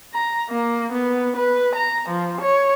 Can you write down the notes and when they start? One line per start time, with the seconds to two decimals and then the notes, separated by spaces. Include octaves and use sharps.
0.14 A#5
0.50 A#3
0.93 B3
1.37 B4
1.75 A#5
2.09 F3
2.41 C#5